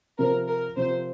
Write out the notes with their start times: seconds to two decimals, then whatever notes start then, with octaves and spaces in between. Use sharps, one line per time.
0.19 C3 F3 C4 F4 A#4
0.48 A#4
0.77 C3 F3 C4 F4 C5